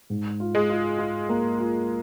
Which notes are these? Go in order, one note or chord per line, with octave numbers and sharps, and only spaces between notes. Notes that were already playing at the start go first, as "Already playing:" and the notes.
G#2
F4
G#3
F4
F4
A#3
F4